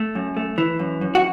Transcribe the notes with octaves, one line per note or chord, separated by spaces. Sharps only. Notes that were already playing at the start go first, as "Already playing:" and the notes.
Already playing: A3
F#2
A3
E3
F#2
F#2
F#4